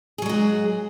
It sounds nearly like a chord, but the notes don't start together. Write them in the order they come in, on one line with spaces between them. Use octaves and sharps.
G#4 F#3 G#3 F#4